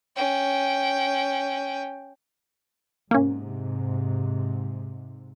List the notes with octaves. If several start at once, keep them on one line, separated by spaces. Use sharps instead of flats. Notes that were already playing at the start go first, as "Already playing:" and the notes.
C#4 G5
G#2 C3 A#3 C#4